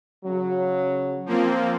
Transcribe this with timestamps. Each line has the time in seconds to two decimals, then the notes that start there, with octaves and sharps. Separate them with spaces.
0.25 C#3 F#3
1.26 F3 A#3 C4